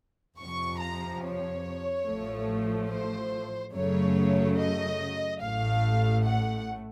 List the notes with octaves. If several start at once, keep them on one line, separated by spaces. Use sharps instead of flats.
F2 C3 F3 C#6
A#5
C#5
A1 A2 F3 A3
C5
F#2 C#3 F#3 A3 C#5
D#5
A1 A2 A3 F5
F#5